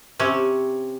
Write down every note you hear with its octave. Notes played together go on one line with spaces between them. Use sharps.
C3 C#4